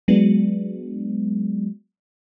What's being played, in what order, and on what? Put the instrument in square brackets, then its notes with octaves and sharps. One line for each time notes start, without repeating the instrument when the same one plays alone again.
[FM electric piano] F#3 G#3 B3 D4